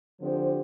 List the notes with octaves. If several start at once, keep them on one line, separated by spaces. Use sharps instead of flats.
D3 F3 C4 G4 C5